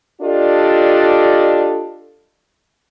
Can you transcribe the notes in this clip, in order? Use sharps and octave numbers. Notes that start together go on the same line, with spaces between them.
D4 F4 G4 A4 D5 D#5